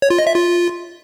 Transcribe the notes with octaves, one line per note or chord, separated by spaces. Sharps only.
C#5
F4
D#5
E5
F4